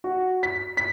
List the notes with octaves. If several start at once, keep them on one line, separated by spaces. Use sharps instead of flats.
F#4
B6
B6